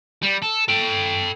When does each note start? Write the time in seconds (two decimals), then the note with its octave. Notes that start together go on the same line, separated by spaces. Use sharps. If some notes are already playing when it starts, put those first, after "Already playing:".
0.22 G3
0.42 A4
0.68 A4 G5